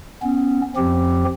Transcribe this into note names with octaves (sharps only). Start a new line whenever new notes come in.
B3 C#4
F2 F3 C4 G4